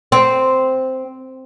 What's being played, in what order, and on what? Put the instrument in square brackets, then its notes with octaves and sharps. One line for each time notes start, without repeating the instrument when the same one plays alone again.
[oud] C4